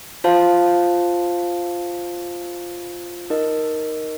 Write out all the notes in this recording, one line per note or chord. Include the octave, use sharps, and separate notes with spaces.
F4 C5 F5 A5
D#4 A#4 D#5